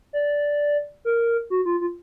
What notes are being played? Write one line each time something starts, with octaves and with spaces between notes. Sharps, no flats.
D5
A#4
F#4
F4
F4